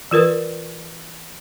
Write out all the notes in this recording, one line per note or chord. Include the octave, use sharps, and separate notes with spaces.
E3 F4 A#4 B4